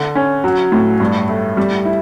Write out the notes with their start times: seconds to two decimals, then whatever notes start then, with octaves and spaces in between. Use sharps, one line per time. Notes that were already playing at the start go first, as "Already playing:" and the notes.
Already playing: D3
0.15 C#4
0.44 F#3
0.72 A2
1.00 G2
1.29 A3
1.57 G3
1.85 E4